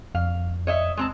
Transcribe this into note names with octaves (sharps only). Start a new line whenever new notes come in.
F2 F5
C#5 D#5 E5
G#3 C4 A5